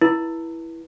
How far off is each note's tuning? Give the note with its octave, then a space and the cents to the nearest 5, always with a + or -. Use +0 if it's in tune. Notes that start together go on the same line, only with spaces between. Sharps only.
E4 +0 B4 -35